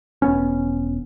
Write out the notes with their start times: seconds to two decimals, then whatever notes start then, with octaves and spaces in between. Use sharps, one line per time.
0.22 E1 B3 C#4